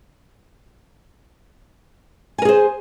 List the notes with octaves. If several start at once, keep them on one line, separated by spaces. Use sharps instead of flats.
G#4 A#4 C5 G#5